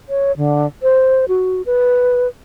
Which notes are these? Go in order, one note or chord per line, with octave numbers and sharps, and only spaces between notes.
C#5
D3
C5
F#4
B4